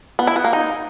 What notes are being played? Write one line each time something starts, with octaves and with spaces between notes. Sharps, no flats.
B3
E4
B3
A#3
D#4